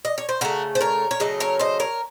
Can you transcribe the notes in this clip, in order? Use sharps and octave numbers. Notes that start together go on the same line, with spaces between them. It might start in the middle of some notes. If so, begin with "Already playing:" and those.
D#5
C#5
C5
C#3 A3 F#4 A#4
C5
A#4 C#5
C#5
C#3 F#3 A3 D#5
A#4 C#5
C5 D#5
A#4 C#5